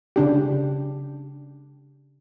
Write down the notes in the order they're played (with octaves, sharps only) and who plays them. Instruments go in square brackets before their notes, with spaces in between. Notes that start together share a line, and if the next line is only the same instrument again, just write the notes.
[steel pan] C#3 D4 G4